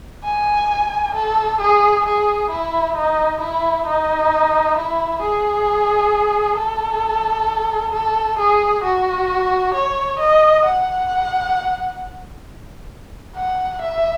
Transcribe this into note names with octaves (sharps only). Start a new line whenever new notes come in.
G#5
A4
G#4
G#4
E4
D#4
E4
D#4
E4
G#4
A4
A4
G#4
F#4
C#5
D#5
F#5
F#5
E5